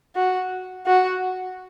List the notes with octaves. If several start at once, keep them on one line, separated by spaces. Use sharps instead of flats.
F#4
F#4